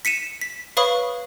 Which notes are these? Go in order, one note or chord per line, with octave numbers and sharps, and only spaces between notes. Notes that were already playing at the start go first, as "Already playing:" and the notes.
B6 C#7 D#7 E7
B6
B4 C#5 F5 B5 C#6 D#6